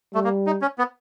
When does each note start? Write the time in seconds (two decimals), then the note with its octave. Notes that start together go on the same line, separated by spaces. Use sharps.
0.14 G3 A3
0.24 A#3
0.47 D#4
0.62 C#4
0.78 B3